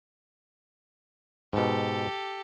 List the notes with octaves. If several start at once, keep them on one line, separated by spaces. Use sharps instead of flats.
G#2 B2 G4 A4